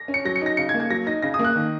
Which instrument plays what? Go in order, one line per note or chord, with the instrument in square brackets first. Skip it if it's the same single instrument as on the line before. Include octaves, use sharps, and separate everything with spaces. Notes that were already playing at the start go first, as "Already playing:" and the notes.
Already playing: [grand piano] A#6
[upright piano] C#4
[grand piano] C#7
[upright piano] F#3 [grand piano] A#6
[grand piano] C#7
[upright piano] D#4 [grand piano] A#6
[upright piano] C#3 [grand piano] C#7
[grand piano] G#6
[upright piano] A#3
[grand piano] G#6
[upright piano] F#3 [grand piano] A#6
[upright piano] D#4 [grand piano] A#6
[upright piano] C#3 [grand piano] A#6
[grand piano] D#6
[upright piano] A#3
[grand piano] F#6
[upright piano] D#3